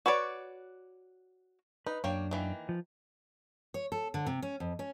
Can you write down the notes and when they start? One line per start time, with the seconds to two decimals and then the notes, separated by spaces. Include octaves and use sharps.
0.06 F#4 B4 C#5 D5
1.87 D#4 B4
2.04 F#2 A#3 D4 C#5 G5
2.31 D#3 E3 A#3
2.69 F3
3.74 C#5
3.92 A4
4.14 D3
4.26 C3
4.42 C#4
4.60 F2
4.79 C#4